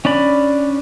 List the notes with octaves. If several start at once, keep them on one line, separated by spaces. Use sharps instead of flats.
C#4 D4 D5 B5